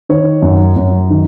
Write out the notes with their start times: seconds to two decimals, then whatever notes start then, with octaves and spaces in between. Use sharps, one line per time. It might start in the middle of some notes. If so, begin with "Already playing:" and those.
0.09 D#3 C#5
0.42 F#2
0.76 F#2
1.10 D#3